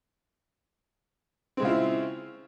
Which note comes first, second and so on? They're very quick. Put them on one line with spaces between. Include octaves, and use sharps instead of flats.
C4 G#3 C#3 F4 E4